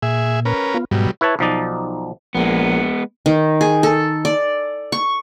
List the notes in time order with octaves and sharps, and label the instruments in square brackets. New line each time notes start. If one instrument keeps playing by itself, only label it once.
[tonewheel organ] A#2 [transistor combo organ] G#4 E5
[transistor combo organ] C#4 A#4 B4
[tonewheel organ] B3 F4
[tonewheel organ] G#2 [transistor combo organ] B2 F#3 G3
[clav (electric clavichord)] E4 B4 C#5 A5
B1 F3 D#4 D5
[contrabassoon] A#1 [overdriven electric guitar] G#3 B3
[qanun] D#3
G#4
A4
D5
C#6